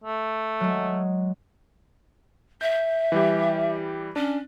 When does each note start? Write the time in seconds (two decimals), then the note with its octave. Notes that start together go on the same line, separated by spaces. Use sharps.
0.04 A3
0.61 F#3 G#3
2.61 E5 G6
3.12 E3 G3 G4
4.16 C#4 D4